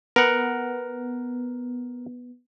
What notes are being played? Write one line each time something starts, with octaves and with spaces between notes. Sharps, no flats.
B3 A#4 F#5